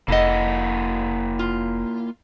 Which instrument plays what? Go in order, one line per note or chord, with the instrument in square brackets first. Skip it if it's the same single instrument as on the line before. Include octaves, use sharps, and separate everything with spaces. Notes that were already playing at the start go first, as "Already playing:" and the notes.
[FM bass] F1 [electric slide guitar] A#3 E4 F#5 [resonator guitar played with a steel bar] A4 D#5
[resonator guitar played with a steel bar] F4